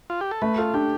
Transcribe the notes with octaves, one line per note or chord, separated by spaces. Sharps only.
F4
G4
A4
A3 B4
F4 A4
D4 G4